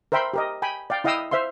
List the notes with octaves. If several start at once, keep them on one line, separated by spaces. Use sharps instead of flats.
A#4 C5 E5 G5 B5 C6
G4 A#4 D#5
G5 G#5 B5
D5 F5 G5
E4 D#5 F5 G5 D#6 E6
C5 E5 F5 C6